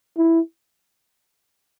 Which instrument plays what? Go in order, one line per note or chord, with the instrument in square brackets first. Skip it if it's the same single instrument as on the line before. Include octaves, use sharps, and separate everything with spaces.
[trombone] E4